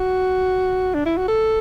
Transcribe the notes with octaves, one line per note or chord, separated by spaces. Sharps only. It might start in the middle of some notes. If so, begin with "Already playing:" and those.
Already playing: F#4
D4
E4
F#4
A4